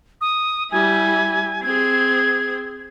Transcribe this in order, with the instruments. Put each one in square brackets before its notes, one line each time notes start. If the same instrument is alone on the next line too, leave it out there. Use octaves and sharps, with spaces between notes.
[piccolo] D#6
[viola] G3 E4 [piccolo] G#5
[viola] C4 G#4 [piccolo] G#6